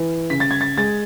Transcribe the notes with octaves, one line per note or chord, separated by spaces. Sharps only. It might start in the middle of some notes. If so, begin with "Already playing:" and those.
Already playing: E3
C#3 B6
A6
G#6
A6
G#3 A6